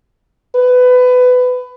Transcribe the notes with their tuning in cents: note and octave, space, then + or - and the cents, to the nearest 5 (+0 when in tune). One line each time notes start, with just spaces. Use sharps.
B4 +20